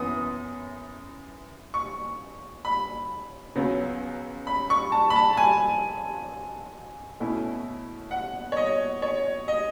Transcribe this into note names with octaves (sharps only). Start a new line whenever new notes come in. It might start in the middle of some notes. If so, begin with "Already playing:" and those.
Already playing: F#2 E3 B3 D#6
C#6
B5
C#2 C#3 F#3 B3
B5
C#6
A5
B5
A5
A5
G#5
B2 A3 C#4 E4
F#5
C#5
D#5
C#5
D#5